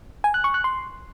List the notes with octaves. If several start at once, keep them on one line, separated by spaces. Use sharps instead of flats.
G#5
F#6
C#6
F#6
C6